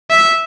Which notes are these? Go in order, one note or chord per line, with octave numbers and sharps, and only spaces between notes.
E5